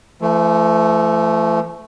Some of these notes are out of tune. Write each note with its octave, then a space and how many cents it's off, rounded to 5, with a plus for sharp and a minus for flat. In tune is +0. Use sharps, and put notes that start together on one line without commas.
F3 -45 A3 +0